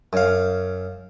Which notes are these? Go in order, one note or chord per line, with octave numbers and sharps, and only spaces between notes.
F#2 F5